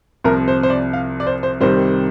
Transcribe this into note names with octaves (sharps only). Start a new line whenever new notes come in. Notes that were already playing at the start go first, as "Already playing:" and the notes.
C2 C3 F3 A#4
C5
C5
D5
F5
D5
C5
C5
C2 C3 D#3 G3 C5